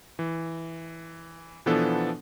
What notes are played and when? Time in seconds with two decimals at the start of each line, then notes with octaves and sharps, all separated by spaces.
0.19 E3
1.66 B2 E3 F3 B3 D4 A4